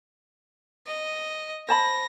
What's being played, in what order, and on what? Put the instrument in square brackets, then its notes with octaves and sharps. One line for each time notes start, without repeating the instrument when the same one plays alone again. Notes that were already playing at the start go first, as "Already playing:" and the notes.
[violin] D#5
[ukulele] C5 A5 B5 [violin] A#6